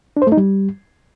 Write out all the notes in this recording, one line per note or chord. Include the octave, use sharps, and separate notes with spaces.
D4
C5
A3
D#4
G3